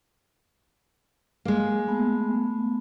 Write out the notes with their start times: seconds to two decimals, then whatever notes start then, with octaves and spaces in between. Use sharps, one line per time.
1.45 G#3 A#3
1.88 A3 B3